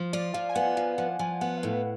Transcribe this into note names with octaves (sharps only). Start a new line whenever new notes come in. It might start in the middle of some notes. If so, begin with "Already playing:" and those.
Already playing: F3
F4 D5
F3 F5
G#5
B3 F#5
F3 F5
F3 F#5
F3 G#5
B3 F#5
F5
A2
B4